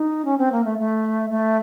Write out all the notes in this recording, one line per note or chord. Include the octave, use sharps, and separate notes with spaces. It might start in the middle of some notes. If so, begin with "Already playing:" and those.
Already playing: D#4
C#4
C4
A#3
A3
A3
A3